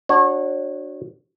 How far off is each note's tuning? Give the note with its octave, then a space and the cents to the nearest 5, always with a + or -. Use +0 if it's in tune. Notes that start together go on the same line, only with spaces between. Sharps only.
D4 +0 F#4 +0 C#5 -30